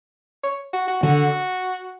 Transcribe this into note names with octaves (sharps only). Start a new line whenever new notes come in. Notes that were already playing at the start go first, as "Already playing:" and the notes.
C#5
F#4
F#4
D3 F#4